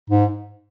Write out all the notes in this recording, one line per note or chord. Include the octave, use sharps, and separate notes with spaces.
G#2